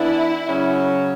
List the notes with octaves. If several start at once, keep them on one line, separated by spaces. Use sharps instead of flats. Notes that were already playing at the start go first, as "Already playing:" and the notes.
Already playing: E3 B3 D4 E4
C#3 F#3 C#4